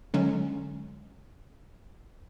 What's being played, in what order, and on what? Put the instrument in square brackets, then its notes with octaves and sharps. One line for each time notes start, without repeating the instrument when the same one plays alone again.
[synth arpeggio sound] D3 F#3 G#3 C#4